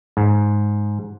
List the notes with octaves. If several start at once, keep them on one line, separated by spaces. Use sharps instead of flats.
G#2